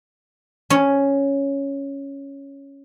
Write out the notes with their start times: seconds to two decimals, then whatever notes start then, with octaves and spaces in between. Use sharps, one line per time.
0.70 C#4 C#5